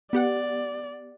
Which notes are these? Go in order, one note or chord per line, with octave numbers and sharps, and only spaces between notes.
B3 G4 D5 F#5